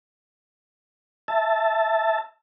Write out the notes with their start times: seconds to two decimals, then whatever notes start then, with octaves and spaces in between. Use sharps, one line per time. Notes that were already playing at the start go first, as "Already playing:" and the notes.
1.28 E5 A5